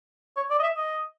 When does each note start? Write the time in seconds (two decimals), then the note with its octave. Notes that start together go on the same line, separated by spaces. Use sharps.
0.37 C#5
0.51 D5
0.59 D#5
0.63 E5
0.77 D#5